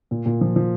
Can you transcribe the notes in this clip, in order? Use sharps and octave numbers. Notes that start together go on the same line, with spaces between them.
A#2
A#2
F3
F3